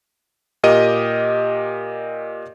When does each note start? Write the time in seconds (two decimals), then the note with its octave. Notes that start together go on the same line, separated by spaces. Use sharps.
0.63 A#2 G4 A#4 D#5 D#7